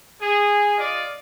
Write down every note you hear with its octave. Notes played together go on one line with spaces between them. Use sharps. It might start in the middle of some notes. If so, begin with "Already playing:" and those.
G#4
F4 D5 D#5